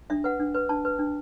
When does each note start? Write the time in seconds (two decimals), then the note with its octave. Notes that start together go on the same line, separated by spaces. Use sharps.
0.10 D4 E5
0.24 B4 F#5
0.39 D4
0.54 B4
0.69 D4 A5
0.85 B4
0.99 D4